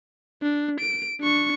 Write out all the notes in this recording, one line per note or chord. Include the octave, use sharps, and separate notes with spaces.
D4
D7
D4 C#6